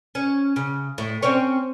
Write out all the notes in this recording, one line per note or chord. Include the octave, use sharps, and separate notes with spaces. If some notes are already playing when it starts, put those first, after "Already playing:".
C#4
C#3
A2
C4 C#4 C#5